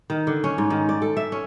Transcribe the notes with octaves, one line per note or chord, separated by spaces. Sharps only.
D#3
D3
C#4
G#2
D#3
D5
A4
E5
C#4